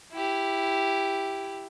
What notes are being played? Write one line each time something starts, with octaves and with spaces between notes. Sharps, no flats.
E4 G4